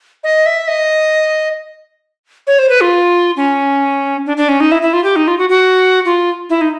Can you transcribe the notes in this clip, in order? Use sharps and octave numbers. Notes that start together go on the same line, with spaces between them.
D#5
E5
D#5
C#5
C5
B4
F4
C#4
D4
D4
C#4
D#4
E4
E4
F4
G4
D#4
F4
F#4
F#4
F4
E4
D#4